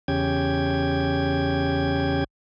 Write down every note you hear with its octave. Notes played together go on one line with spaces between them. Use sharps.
E2 C#3 C#4 G4 G5 G#6